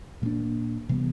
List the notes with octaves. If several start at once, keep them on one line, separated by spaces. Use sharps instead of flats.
A#2 G3 A#3 D4
C3 E3 G3 B3